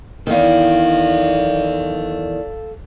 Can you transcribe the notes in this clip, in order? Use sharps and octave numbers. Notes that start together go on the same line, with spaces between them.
E2 D#3 A4 F5